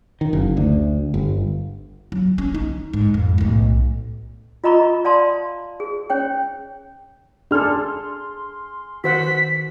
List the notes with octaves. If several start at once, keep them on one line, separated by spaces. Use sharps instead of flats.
D#3
F#1
D2
G1
F#3
C#4
D#4
G#2
F2
B1 A2
F4 D#5 A#5 B5 C#6
D5 F5 A5 C6
G#4
C#4 C#5 G5
D4 G#4 A4 C6 F6
D#3 F#4 C5 F#5 B6